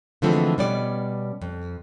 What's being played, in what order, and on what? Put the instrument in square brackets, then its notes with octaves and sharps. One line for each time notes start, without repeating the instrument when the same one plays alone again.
[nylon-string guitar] D3 E3 F3 G#3 A3 C4
B2 G3 C#4 D5
F2